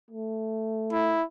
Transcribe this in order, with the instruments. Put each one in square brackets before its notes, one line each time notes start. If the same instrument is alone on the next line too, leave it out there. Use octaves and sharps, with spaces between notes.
[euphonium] A3
[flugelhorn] E4